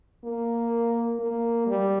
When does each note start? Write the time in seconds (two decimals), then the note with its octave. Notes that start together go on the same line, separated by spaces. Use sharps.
0.24 A#3
1.19 A#3
1.67 G3